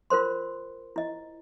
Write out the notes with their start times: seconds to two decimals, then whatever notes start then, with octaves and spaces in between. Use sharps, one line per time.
0.10 F4 A#4 C5 C6
0.96 E4 D#5